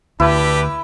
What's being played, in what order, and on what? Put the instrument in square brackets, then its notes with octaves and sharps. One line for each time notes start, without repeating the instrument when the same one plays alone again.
[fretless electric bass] D2 [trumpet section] D4 G4 B4 [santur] E4